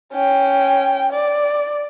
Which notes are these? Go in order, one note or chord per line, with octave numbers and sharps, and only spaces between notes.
C#4 G5
D5